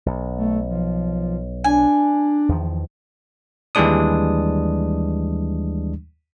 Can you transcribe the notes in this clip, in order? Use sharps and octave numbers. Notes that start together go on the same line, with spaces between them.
B1
A3
F3
D4 G#5
E2 D#3 F3
D#2 E3 G3 G#3 D4 D#6